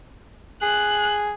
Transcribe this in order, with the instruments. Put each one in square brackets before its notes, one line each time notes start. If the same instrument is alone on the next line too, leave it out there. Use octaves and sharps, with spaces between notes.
[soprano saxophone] G#4 [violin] F#6